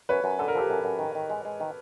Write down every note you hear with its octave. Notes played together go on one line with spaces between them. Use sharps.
F#2 B4 C#5
F#2
D3 A4
A#4
F3 G4 A4
F#2
F#2
D#3
D#3
G#3
G#3
D#3